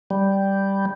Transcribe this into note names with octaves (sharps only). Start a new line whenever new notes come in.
G3